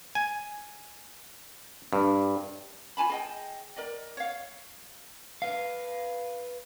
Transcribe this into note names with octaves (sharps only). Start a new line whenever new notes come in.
G#5
G2
F4 G#5 A5 B5
G#4 D#5 G5
A#4 D5 D#5
C#5 F5
B4 F5